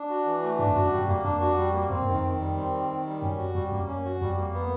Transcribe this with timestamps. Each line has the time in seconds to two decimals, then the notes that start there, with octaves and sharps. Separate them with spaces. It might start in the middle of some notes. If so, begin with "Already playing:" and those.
Already playing: D4
0.09 F#4
0.25 E3
0.43 A3
0.59 G#2 D4
0.67 F2
0.75 F#2 F#4
0.91 G3
0.98 F#2
1.08 F2 A#3
1.25 F2 D4
1.41 F#4
1.57 G3
1.73 A#3
1.90 F2 C4
2.02 F#2
2.07 D#3
2.14 F2
2.23 D#3
2.40 G3
2.56 C4
2.73 D#3
2.89 D#3
3.06 G3
3.22 F#2 C#4
3.38 F#4
3.55 F2 G3
3.72 F#2 A#3
3.88 C#4
4.05 F#4
4.21 F2 G3
4.37 A#3
4.54 B3